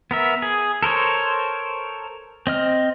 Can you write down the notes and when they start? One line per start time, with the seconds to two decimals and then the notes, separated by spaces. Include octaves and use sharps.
0.11 B3 A#4 E5
0.42 G#4
0.83 A4 A#4 C5 C#5
2.47 C4 D#5 F6